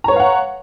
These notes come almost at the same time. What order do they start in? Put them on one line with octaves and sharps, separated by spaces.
A#5 C#5 B4 F5 F#5